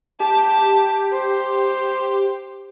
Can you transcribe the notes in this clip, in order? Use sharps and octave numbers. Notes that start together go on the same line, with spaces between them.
G4 A5
C5